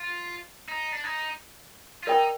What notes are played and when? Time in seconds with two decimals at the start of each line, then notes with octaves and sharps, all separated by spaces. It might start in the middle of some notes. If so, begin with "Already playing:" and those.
Already playing: F4
0.69 D#4
0.92 D4
1.04 D#4
2.03 F4
2.07 D#4 A#4 D5 G5